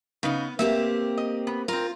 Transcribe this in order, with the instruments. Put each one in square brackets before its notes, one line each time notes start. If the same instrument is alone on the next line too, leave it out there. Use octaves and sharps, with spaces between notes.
[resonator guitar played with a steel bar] C#3 D#4 [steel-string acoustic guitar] B3
[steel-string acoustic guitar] A#3 C4 G4 [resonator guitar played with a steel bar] E5
[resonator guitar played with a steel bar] D#5
B3
[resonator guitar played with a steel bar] C4 A#4 [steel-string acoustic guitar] F4